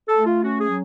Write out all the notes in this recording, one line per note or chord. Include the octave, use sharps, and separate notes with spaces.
A4
A3
F4
C#4 F#4
G#4
F#3